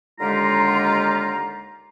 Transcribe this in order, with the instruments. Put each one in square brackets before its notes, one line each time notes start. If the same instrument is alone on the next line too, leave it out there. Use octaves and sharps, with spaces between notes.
[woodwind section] D#2 D3 G#3 F4 G4 A#5